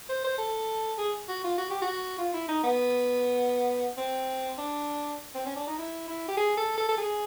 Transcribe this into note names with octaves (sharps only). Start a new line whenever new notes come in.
C5
C5
A4
G#4
F#4
F4
F#4
G4
F#4
F4
E4
D#4
B3
C4
D4
C4
C#4
D4
D#4
E4
E4
G4
G#4
A4
A4
A4
G#4